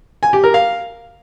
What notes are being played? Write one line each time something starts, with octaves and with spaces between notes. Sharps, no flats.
G#5
G4
A#4
F5